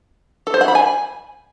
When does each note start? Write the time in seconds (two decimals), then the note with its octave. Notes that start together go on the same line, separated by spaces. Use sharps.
0.47 A4
0.54 C5
0.61 F#5
0.68 B5
0.75 G#5